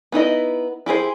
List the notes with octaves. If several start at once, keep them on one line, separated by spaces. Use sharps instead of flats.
B3 D#4 E4 D#5
E4 G4 G#4 C5